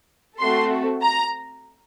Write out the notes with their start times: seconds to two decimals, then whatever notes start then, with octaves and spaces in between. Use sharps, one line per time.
0.39 A3 C4 F#4 A4 C6
1.03 A#5